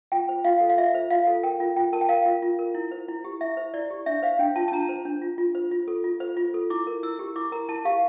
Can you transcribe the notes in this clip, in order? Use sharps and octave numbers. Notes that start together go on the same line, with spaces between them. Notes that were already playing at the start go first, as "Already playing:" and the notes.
F4 G5
C5
F4 F5
A4
F5
F4 E5
C5
F4 F5
A4
A#4 G5
F4
F4 G5
A#4 A5
G5
A#4 F5
F4
F4
A#4
E4
C5
E4
G4
E4 E5
C5
E4 D5
G4
D4 E5
C5 F5
D4 G5
F4 A5
A5
D4 A#5
C5
D4
F4
F4
C5
F4
A4
F4
C5
F4
A4
E4 D6
A#4
E4 E6
G4
E4 D6
A#4 A#5
E4 A5
G4 F5